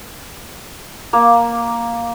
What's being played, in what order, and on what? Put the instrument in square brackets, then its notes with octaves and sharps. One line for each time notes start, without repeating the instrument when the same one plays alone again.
[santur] A#3 A#4